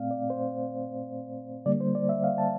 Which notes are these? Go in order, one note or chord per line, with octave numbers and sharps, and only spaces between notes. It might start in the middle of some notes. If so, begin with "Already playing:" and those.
Already playing: A#2 A3 C4 D5 F5
D5
C5
D3 G3 A#3 D5
C5
D5
E5
F5
A5